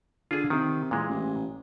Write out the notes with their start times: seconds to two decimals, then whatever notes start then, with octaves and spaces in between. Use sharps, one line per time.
0.31 D3 F4 G#4
0.50 C3 D#3
0.91 A#2 E3 G#3
1.09 A1